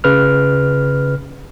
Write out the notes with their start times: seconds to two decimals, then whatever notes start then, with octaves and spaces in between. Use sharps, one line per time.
0.04 C#3 B4 F6